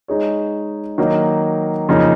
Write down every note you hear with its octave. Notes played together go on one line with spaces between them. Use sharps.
G#3 D#4 G#4 C#5
D#3 F#3 A#3 D#4 F#4
F2 C#3 F3 A#3 D#4